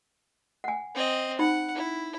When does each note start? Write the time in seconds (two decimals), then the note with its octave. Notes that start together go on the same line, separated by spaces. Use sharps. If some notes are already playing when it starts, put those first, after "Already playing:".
0.64 F#5 G#5
0.95 C4 D#5
1.39 D#4 F#5 B5
1.75 E4